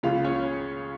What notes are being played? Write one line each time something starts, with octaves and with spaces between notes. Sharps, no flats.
C#2 C#3 F4 F5
C#4 C#5